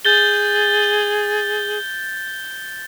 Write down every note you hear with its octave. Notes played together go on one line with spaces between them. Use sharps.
G#4 G6 A6 G7